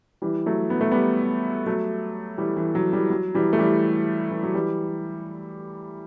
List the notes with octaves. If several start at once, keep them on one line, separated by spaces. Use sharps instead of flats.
E3 G3
F#3 A3
B3
A3
G3 B3
F#3 A3
E3 G3
E3
F#3
E3 G3
F#3
E3 G3
A3
E3 G3
E3
F#3
E3 G3